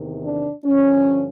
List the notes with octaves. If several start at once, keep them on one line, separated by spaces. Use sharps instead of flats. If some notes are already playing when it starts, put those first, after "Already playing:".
Already playing: E2 C3 D#3
D4
G2 D3 F3 C#4